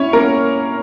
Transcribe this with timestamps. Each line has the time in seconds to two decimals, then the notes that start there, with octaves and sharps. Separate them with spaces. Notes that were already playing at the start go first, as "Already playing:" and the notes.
Already playing: C#4 E4 C#5
0.13 A#3 A#4